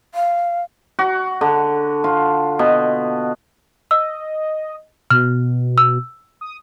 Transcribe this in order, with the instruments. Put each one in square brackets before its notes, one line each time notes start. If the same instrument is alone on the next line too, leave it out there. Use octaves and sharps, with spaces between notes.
[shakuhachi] F5
[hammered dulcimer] F#4
D3
F4
B2
[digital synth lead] D#5 [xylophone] E6
[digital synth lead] B2 [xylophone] F6
[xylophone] E6
[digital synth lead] D#6